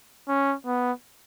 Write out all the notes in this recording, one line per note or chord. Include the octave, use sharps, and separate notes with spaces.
C#4
B3